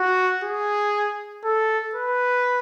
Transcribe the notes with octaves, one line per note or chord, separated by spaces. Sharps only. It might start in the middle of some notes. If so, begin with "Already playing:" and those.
Already playing: F#4
G#4
A4
B4